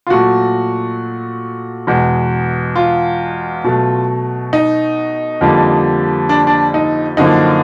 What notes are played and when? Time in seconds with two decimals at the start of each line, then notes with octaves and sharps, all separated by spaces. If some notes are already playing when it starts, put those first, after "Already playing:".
0.07 F4
0.10 A#2 F#3 A3 F#4
1.87 E2 B2 G#3
2.76 F4
3.64 B2 F#3 A3
4.53 D#4
5.41 F2 D3 G3 A#3
6.29 D4
6.47 D4
6.74 D#4
7.17 F#2 D3 F3 A#3 D#4